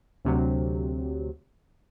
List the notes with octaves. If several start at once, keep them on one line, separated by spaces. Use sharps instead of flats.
D2 C3 F#3